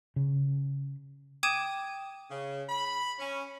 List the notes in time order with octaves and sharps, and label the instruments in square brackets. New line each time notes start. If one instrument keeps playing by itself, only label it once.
[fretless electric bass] C#3
[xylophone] G5 D6 D#6 G#6 D#7 E7
[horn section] C#3
B5
C#4